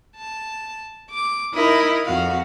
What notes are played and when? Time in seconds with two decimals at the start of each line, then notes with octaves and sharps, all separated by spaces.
0.16 A5
1.10 D6
1.54 D#4 E4 A#4 D#6
2.05 F2 F#4 F5